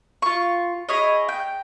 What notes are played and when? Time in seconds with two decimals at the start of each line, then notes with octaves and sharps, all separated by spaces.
0.22 F4 C#6
0.89 E4 G#4 C#5 D#5
1.29 G5